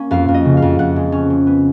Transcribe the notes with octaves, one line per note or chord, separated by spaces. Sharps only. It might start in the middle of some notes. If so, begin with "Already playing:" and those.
Already playing: A#3 C#4
F2 F5
F2
D#5
C#3
F5
F2
F2 F#5
G#3
C#4
G#3
B3